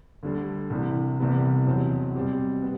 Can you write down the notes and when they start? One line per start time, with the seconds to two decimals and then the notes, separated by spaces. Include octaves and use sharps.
0.23 D2 D3 G3
0.70 C2 C3 E3
1.19 C2 C3 E3 G3 B3
1.67 E2 B2 F#3 C4
2.15 B2 G3 C4 G4
2.62 B3